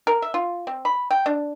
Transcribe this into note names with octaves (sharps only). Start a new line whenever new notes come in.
A#4
E5
F4
C4
B5
G5
D4